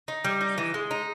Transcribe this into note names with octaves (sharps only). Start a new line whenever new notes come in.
D#4
G3
D#4
E3
G#3
D#4